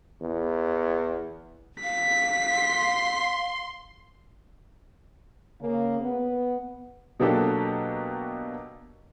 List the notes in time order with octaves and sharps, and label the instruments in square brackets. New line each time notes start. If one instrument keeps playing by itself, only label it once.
[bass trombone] E2
[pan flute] F5 [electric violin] B6
[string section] C6
[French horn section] C#3 A#3
B3
[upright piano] B2 F#3 A#3 D4 G4 A4